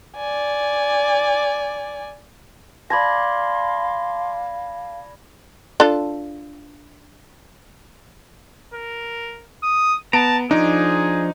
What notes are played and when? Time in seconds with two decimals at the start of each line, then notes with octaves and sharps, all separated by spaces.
0.16 D5 G#5
2.90 D5 F5 A5 B5 C6 G#6 A#6
5.80 D4 F4 A4
8.74 A#4
9.63 D#6
10.13 B3 A5 A#5 D7
10.51 F3 D4 D#4 G#4